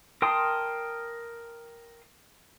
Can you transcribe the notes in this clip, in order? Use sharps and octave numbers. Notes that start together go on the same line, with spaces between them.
A#4 G5 A5 C6 D#6